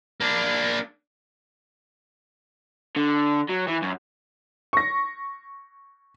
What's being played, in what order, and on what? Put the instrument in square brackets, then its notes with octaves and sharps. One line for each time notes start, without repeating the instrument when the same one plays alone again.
[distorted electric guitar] A#3 D4
[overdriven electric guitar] D3
F#3
E3
F#2
[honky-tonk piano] C#6 A#6